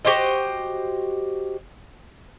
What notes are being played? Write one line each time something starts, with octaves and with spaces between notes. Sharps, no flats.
F#4 G4 C5 D#5